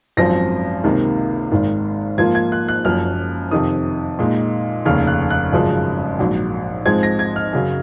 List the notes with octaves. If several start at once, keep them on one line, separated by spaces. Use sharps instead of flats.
G#1 F#2 F3 C4 A#6
C#2 C3 D#3 A#3
G#1 G#2 D#3
G#2 F3 A#3 F4 G#6
G#6
F#6
F#6
F#1 F#2 F3 F6
F2 C3 D#3 D#6
A#2 G#3 D#4
F1 D#2 C#3 F6
F#6
F#6
G#1 F#2 C#3 F3 G#3
A#1 G#2 F#3
G#2 F3 G#3 C4 G#6
A#6
G#6
F6
F#2 C#3 F#3